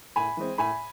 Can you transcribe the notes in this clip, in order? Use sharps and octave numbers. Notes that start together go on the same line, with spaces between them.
A2 G#5 B5
E3 G#3 C4
A2 G#5 B5